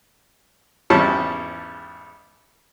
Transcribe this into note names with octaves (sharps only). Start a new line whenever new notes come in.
G#1 E2 G3 C#4 A5